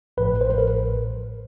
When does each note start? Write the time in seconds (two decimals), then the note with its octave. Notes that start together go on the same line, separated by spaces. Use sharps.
0.17 A1 A2 F3 B4
0.41 C5
0.50 B4
0.58 A#4